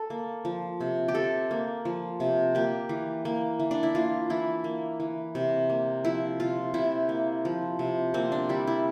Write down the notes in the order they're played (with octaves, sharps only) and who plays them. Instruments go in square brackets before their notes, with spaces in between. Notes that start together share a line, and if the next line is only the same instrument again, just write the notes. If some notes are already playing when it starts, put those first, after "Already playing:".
Already playing: [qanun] A4
A#3
F3
C3
G4
C3 A4
A#3
F3
C3
A#3 G4
E3
A#3
E3
D4
E4
A#3 F4
E3 E4
A#3
E3
C3
A#3
F3 E4
C3 F4
C3 E4
A#3
F3
C3
A#3 C4
D4
G3 E4
E4